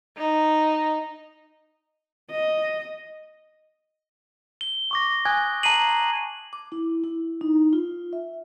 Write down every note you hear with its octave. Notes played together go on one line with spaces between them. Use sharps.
D#4
D#5
G7
C#6 D6 A#6
G#5 D#6 F#6 G#6
A5 A#5 G#6 C7 D#7 F#7
D6
E4
E4
D#4
F4
E5